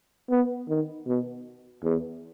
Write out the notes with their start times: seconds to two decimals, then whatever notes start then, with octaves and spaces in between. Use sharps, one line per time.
0.30 B3
0.69 D#3
1.07 B2
1.84 E2